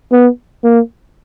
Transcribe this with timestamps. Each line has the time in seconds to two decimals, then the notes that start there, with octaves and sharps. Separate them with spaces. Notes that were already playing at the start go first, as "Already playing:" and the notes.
0.12 B3
0.64 A#3